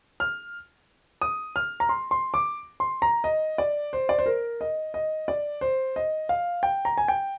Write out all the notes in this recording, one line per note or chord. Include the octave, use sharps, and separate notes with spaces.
F6
D#6
F6
A#5
C6
C6
D6
C6
A#5
D#5
D5
C5
D5
C5
A#4
D#5
D#5
D5
C5
D#5
F5
G5
A#5
G#5
G5